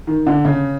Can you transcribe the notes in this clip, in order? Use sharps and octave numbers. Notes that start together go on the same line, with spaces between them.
D#3
D3
C#3